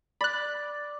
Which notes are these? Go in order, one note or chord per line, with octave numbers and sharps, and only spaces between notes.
D5 B5 F#6